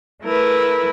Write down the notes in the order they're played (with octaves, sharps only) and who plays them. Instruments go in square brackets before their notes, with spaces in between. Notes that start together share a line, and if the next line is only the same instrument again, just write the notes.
[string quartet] A3 E4 A#4 B4